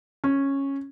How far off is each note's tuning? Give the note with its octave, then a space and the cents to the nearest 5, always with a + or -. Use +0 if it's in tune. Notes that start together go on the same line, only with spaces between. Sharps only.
C#4 -10